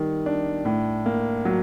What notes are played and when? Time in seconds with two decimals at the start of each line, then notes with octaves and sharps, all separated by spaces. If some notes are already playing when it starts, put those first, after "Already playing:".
Already playing: D#3 G3
0.26 D4
0.65 A2
1.06 A#3
1.45 F#3